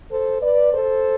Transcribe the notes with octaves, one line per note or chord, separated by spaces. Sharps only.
A4 C5
B4 D5
A4 C5